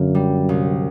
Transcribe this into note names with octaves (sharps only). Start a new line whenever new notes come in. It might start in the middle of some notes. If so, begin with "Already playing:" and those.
Already playing: F#2 D3 A#3
G3
C2